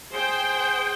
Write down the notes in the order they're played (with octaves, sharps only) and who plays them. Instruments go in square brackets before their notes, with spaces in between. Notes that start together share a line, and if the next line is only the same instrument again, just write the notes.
[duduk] G#4 [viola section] C5 G5